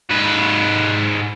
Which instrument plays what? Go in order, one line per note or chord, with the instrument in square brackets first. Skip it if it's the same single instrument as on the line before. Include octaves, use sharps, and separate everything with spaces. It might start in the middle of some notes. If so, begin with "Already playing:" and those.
[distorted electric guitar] G#2 B4